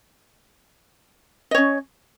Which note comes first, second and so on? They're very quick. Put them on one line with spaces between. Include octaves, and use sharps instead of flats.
D#5 C#5 C#4